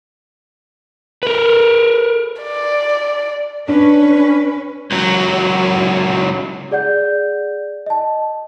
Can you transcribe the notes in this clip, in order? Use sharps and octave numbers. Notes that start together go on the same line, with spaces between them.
A#4 B4
D5
C#4 D4 B4
C#2 F#3
G#4 D5 F#5 G6
D#5 A5